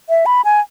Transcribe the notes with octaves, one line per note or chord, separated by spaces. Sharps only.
E5
B5
G#5